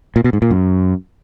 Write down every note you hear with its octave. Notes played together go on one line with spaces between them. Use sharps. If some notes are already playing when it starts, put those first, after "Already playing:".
A#2
B2
G#2
A#2
F#2